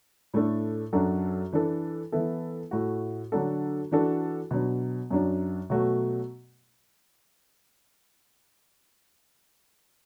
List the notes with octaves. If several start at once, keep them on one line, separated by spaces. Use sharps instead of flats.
A2 A3 D4 A4
F#2 F#3 D4 F#4 A4
E3 D4 A4
E3 B3 E4 A4
A2 A3 F#4
D3 F#3 D4 F#4 A4
E3 D4 F#4 A4
B2 F#3 D4
F#2 F#3 D4
B2 F#3 A3 F#4